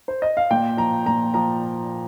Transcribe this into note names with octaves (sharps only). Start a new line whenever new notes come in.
C5
D#5
F5
A#2 G5
F3 A#5
A#2 A#5
F3 A#5